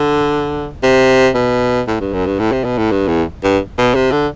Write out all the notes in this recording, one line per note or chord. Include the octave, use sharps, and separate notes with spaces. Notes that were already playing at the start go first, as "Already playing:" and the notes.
Already playing: D3
C3
B2
A2
G2
F#2
G2
A2
C3
B2
A2
G2
E2
G2
B2
C3
D3